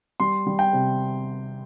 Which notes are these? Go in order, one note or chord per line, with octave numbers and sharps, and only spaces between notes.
G3 C6
G3
G5
C3